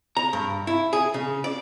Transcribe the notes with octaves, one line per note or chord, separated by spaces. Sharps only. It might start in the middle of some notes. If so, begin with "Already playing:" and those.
A#5
G2
E4
G#4
C#3
D5